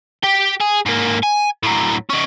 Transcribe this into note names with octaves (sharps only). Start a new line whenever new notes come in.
G4 G5
G#4
G#2 A#3
G#5
A2 F#3
C#4 D#4